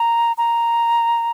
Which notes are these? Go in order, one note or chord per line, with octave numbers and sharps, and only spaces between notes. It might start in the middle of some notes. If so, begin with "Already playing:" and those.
Already playing: A#5
A#5